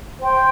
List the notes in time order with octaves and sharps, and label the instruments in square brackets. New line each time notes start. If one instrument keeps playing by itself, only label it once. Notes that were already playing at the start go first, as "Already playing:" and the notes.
[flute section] C5 G5 C6